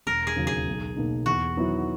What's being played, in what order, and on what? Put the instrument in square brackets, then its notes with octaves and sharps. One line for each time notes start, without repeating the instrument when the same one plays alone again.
[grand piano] E1 [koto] A#4
[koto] G#4
[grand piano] D#2 C#3 F#3
[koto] G#4
[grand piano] B1
B2 A#3 D#4
[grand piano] E2 [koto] F#4
[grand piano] D#3 F#3 B3 E4